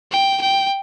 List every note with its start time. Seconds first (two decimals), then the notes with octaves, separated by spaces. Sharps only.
0.11 G5
0.41 G5